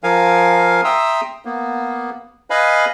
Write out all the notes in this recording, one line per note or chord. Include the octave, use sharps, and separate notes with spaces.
F3 A#4 F5 G#5
E5 G5 A#5 C6 D#6 E6
A#3 B3
B4 D#5 F5 G#5 B5